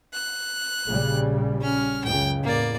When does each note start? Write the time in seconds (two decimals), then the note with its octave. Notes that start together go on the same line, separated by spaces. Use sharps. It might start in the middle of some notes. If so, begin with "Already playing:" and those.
0.13 F#6
0.85 A#1 C#3 G3
1.61 C#4 F6
2.04 C#2 F#2 C#3 G5
2.43 E2 A2 A#3 D5